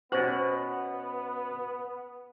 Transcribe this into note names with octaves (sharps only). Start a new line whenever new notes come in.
B2 B3 C#4 F#4 C5